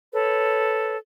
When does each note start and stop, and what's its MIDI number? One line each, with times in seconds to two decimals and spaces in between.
0.14 0.96 69
0.14 0.96 71
0.14 0.96 73